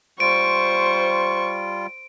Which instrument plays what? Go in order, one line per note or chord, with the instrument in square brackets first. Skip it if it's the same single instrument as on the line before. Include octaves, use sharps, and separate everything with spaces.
[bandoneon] G3 F4 [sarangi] C5 [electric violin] C#6 [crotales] D7